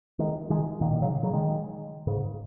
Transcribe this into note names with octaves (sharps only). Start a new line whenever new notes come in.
D#3 G#3
D#3 G#3
A#2 D#3
A#2 D#3
C#3 F#3
C#3 F#3
D#3 G#3
G#2 C#3